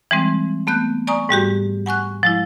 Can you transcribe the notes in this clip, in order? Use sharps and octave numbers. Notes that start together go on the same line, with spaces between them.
E3 G3 G#3 C4
A3 B3 F#6 G6
D5 G#5 A#5 C#6 D#6
G#2 G3 F#4 G4
F#5 G#5 C#6 F#6
F3 G#3 E4